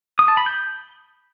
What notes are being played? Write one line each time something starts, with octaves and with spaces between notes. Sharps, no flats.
D#6
A5
B5
G6